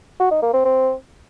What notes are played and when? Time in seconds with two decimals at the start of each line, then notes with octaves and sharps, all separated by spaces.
0.20 F#4
0.31 D#4
0.42 A#3
0.54 C4
0.65 C4